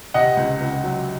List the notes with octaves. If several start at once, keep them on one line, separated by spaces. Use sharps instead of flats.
C3 D#5 F#5
C#2
C#2
F#3